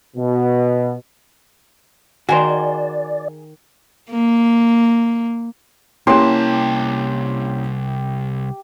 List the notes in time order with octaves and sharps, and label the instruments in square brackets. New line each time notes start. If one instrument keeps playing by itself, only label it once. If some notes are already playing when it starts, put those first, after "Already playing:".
[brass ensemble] B2
[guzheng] D#3 A#4 [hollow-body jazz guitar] F#4 C5 [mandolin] G#4 [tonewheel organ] D5
[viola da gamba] A#3
[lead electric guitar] C2 A5 [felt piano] A#3 C#4 E4 [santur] G4 F#5 [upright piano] C6